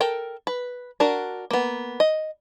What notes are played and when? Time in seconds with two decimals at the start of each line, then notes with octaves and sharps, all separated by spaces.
0.01 A4 A#4 G5
0.47 B4
1.00 D4 F#4 A#4
1.51 A#3 B3
2.00 D#5